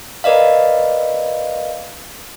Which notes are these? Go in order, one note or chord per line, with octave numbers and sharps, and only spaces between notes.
A#4 B4 D5 D#5 F5